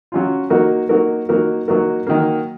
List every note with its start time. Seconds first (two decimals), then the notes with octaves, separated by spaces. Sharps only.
0.12 F#3 C#4 F4
0.50 F#3 A#3 D#4 F#4 A#4
0.89 F#3 A#3 D#4 F#4 A#4
1.29 F#3 A#3 D#4 F#4 A#4
1.68 F#3 A#3 D#4 F#4 A#4
2.07 D#3 F#3 A#3